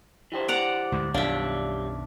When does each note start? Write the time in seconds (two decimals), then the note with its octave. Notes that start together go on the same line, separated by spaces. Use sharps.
0.32 E3 G4 C5
0.48 D5 F#5 A#5
0.92 D2 G#2
1.14 B1 F#2 D#3 G3 D4 C#5 E5 F5